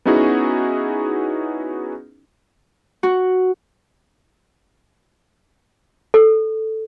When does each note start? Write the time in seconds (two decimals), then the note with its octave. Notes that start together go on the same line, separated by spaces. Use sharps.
0.06 B3 C#4 D#4 E4 F#4 G#4
3.03 F#4
6.14 A4